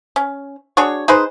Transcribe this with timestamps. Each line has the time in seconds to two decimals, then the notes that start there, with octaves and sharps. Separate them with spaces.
0.16 C#4
0.77 D4 F#4 G#4 C#5
1.08 D#4 G#4 B4 C5